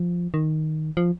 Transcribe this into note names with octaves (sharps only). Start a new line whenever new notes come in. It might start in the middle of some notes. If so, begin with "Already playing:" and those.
Already playing: F3
D#3
F3